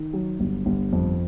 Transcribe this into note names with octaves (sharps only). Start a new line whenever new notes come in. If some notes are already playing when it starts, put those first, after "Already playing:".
Already playing: D#3
F#3
G1
G1
F2